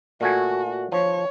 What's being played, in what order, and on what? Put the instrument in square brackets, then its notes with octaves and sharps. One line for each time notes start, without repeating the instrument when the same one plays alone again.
[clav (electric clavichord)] A#2 A3 G#5 [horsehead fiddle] F#4
[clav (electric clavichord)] F3 [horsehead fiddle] C#5